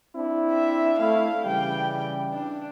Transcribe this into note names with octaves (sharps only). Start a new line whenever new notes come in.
C4 D4 E4
E5
A3 E4 F5
C#3 E3 G3 G5
D4